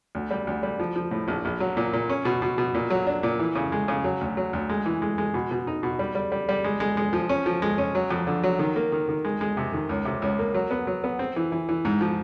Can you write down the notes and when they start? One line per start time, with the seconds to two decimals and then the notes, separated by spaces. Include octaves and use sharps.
0.15 D2
0.31 G3
0.47 D2
0.63 G3
0.80 F3
0.96 F3
1.11 A2
1.28 A#1
1.45 A#1
1.60 F#3
1.77 A#2
1.93 A#2
2.09 C#4
2.25 B2
2.42 B2
2.58 B2
2.74 A#2
2.90 F#3
3.07 D4
3.23 A#2
3.40 E3
3.55 C#3
3.72 G#3
3.88 C#3
4.04 F#3
4.21 D2
4.37 F#3
4.53 D2
4.70 G#3
4.85 E3
5.02 G#3
5.18 G#3
5.34 B2
5.51 B2
5.67 D#4
5.83 B2
5.99 G3
6.15 G3
6.32 G3
6.49 G3
6.64 G#3
6.80 G#3
6.97 G#3
7.13 F3
7.29 C#4
7.46 F3
7.62 G#3
7.78 C#4
7.95 F#3
8.10 F2
8.27 D3
8.43 F#3
8.59 D#3
8.76 A#3
8.92 D#3
9.09 D#3
9.25 G#3
9.41 G#3
9.57 C3
9.73 D#3
9.89 C#2
10.05 C3
10.22 C#2
10.39 A#3
10.54 F#3
10.71 B3
10.87 F#3
11.04 B3
11.19 C4
11.36 E3
11.52 E3
11.69 E3
11.85 G#2
12.01 F3